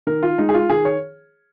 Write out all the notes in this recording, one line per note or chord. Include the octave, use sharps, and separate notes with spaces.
D#3 A#4
F4
G#3 D#4
G#4
F4
D#3 G#4
C#5